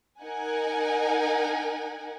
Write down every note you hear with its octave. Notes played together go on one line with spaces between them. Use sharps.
D#4 A#4 F#5 G#5